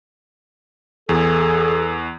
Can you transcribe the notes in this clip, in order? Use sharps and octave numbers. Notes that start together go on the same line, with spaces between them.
E2 G#4 A4